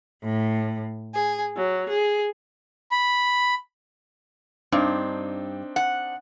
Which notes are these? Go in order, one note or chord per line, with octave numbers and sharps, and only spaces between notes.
A2
G#4
F#3
G#4
B5
G2 C4 D4 D#4
F#5